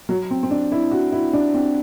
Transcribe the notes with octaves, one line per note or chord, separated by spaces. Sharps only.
F#3
C4
C4
D4
E4
F#4
E4
D4
C4